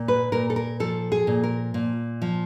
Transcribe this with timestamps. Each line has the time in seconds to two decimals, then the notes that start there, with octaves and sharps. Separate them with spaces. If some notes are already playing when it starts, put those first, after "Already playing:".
Already playing: A#2
0.08 B4
0.32 A#2 A#4
0.50 A4
0.56 A#4
0.80 F3 A4
1.12 G#4
1.27 A#2
1.43 A#4
1.74 A#2
2.22 F3